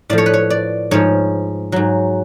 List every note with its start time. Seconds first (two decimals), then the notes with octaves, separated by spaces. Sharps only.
0.10 A2 F3 D5
0.18 C#5
0.26 B4
0.34 C#5
0.50 D5
0.91 G#2 F3 C#5
1.72 G#2 F#3